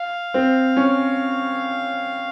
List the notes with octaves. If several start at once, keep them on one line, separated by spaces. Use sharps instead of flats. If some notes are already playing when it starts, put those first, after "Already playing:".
Already playing: F5
C4
C#4